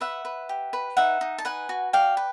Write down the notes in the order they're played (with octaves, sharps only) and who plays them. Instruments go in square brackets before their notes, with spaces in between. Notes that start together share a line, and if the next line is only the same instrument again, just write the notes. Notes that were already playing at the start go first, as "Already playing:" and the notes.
[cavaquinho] B4 E5 F#5
B4
G4
B4
D#4 E5 F#5
D#4
A5
B4 F#5 G#5
F#4
D5 F5 G5
B4